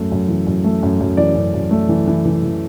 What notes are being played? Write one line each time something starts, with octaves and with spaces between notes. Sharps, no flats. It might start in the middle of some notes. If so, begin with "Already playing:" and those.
Already playing: F#2 A3
F#2
E3
F#2
A3
F#2
F#2
E3 D5
F#2
F#2
A3
E3
E3
E3
E3